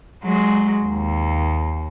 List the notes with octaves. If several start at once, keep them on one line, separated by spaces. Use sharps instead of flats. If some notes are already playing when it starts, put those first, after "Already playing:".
F#3 G#3
D#2